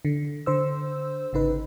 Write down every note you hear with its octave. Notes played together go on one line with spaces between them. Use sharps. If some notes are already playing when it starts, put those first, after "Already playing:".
D3
D3 C5 E6
G#1 C#3 D#4 B4